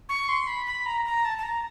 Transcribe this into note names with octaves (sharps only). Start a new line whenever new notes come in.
C#6
C6
B5
B5
A#5
A#5
A5
A5
A#5